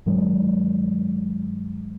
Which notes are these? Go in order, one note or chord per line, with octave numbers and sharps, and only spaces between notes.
G2 D#3 F#3 G#3